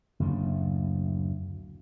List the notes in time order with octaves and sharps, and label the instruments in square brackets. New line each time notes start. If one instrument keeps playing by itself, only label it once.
[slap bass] F#1 D2 A2